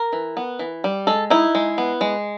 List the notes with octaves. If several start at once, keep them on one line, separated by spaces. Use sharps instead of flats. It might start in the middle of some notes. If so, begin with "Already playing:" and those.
Already playing: A#4
E3
B3
E3
G3
G#3 A4
D#4 E4
G#3
B3
G#3